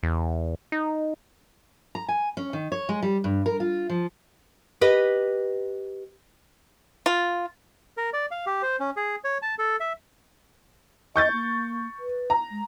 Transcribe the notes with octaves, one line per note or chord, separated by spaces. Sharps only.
E2
D#4
A#5
G#5
C#4
D#3
C#5
G#3
G3
G2
A#4
F4
F3
G4 B4 D#5
F4
A#4
D5
F5
G4
C5
C#4
G#4
C#5
A5
A4
E5
D#5 C#6 G6 A6
A#3
B4
A#5
G#3